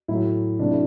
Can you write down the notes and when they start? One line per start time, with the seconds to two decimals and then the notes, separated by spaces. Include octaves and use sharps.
0.08 A2 F#3 A3 E4
0.59 C3 F#3 A3 D4
0.70 E4